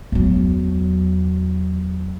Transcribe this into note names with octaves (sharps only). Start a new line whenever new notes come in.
E2 F#3